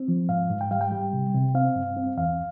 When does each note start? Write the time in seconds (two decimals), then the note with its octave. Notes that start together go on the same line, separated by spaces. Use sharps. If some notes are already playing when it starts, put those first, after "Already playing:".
Already playing: C4
0.08 F3
0.29 G#2 F5
0.50 G#2
0.61 G5
0.71 G3 F5
0.81 G5
0.92 G3
1.13 C3
1.34 C3
1.54 C4 F5
1.76 G2
1.97 C4
2.17 E2 F5